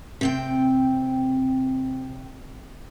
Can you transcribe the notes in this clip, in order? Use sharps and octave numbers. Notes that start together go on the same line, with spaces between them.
C3 C4 G5